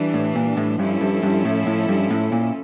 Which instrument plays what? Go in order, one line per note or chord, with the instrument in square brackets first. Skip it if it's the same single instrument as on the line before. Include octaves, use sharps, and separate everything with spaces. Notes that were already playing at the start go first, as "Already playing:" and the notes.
Already playing: [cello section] E3 G3 D4
[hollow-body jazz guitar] A2
A#2
A2
[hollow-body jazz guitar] G2 [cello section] F3 C#4 E4 A4
[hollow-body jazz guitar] G2
G2
A2
A2
G2
A2
A#2